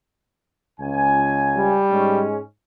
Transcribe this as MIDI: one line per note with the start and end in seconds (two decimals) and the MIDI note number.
0.80 1.81 37
0.80 1.81 80
1.56 2.23 55
1.91 2.40 44
1.91 2.40 56
1.91 2.40 61